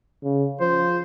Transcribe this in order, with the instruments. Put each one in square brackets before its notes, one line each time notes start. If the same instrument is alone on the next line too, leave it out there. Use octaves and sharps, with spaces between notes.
[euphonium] C#3
[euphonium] F3 [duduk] C5